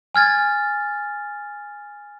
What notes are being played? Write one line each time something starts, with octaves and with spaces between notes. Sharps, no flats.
G#5 F6 G#6 A6